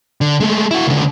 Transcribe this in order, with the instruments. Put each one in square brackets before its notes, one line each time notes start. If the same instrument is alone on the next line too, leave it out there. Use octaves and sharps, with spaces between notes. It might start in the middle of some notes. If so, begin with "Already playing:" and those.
[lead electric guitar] D3
G#3 A3
E4 F#4
C#2 D3